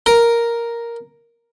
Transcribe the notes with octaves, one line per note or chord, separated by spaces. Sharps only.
A#4